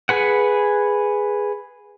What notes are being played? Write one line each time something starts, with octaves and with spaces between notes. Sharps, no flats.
G#4 B4 F#5